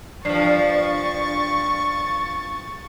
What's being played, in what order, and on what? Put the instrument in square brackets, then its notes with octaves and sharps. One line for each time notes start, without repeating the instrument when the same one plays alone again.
[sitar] G2 F3 [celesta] D5 C7 [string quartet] C#6 A6